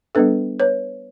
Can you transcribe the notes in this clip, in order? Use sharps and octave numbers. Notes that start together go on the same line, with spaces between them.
G3 B3 D4 A4 B4
B4 C#5